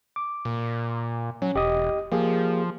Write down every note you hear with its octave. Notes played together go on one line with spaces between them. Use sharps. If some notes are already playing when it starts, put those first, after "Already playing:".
D6
A#2
F#3 C#4
E1 G4 D#5 D#6
F3 A#3 G4 G#4